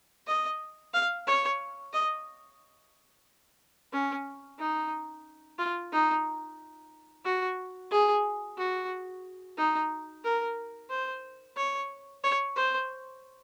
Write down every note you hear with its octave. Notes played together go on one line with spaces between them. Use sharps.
D#5
F5
C#5
D#5
C#4
D#4
F4
D#4
F#4
G#4
F#4
D#4
A#4
C5
C#5
C#5
C5